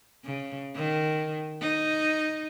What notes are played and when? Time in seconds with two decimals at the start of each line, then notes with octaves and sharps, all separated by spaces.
0.25 C#3
0.76 D#3
1.61 D#4